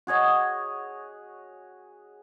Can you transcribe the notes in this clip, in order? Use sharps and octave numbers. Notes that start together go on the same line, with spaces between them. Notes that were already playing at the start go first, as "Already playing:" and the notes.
F#4 G#4 C#5 D#5